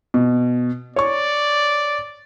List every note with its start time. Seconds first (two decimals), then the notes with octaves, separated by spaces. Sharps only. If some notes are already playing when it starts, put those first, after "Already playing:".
0.14 B2
0.96 C#5 D5 C#6